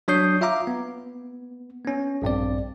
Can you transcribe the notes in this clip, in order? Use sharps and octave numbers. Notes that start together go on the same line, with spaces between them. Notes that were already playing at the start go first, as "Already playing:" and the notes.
F#3 D4 C#5 D#6 G6 C7
F4 E5 F5 A#5 D6
B3
B3 C#4
A#1 G2 C4 D5